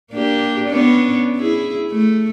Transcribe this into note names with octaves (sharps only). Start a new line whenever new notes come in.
A#3 D4 G4
B3 C#4 D4
E4 G#4
A3